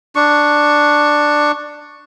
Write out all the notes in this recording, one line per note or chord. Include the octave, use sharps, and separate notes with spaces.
D4 C#6